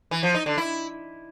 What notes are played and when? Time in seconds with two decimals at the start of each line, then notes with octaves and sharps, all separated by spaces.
0.11 E3
0.23 F3
0.34 D#4
0.46 D3
0.58 E4